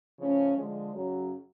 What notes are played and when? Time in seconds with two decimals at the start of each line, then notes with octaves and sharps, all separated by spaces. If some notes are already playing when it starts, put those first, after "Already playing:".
0.19 C#3 F3 A3 C#4
0.57 D3 F3 G#3
0.94 F#2 C#3 F#3